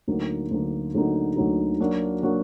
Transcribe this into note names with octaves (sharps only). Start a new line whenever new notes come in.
D2 D3 F#3 A#3 D#4
D2 D3 F#3 A#3 D#4
D2 D3 F#3 A#3 D#4
D2 D3 F#3 A#3 D#4
F#3 A#3 D4 F#4
F#3 A#3 D4 F#4